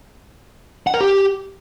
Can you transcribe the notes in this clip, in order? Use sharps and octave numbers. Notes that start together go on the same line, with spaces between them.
F#5
A#4
G4